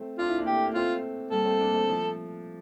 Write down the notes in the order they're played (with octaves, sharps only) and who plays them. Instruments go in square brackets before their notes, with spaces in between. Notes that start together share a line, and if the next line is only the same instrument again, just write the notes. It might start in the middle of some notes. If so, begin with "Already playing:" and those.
Already playing: [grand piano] A3 C4
[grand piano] D4 [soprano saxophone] F4
[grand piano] E4
A#3 D4
[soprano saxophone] G4
[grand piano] A3
A#3
[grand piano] A3 C4 [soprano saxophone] F4
[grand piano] G3 A#3 [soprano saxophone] A4
[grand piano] A3 C4
A#3 D4
A3 C4
F3 A3